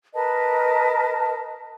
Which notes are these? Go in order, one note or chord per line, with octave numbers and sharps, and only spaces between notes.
A#4 B4 D#5 A5